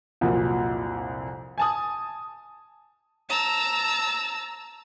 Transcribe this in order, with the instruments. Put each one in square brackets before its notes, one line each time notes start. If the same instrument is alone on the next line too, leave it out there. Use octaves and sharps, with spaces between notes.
[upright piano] C2 F2 A#2 F#3
G#5 A5 D#6
[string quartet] A5 A#5 E6